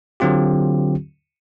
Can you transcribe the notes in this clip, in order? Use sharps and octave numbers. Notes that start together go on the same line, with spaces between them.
D3 F#3 C4 F4 G4